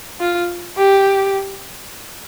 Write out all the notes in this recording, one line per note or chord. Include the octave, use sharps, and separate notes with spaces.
F4
G4